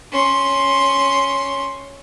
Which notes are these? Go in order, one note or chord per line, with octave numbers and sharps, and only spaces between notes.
C#4 C6